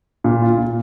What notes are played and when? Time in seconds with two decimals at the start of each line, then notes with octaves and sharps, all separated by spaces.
0.24 A#2
0.42 F4
0.58 A#2